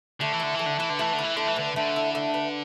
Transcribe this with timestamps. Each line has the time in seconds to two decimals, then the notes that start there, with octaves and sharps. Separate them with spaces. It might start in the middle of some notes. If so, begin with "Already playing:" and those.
0.21 D3 A3
0.33 E3
0.40 D3 E4
0.55 E3 A3
0.66 D3
0.78 E3 B4
0.89 D3
0.99 E3 A3
1.13 D3
1.19 E3 E4
1.36 D3 A3
1.47 E3
1.56 D3 B4
1.76 D3 A3
1.96 E4
2.15 A3
2.34 B4